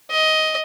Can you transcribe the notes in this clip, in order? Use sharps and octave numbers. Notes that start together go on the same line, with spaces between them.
D#5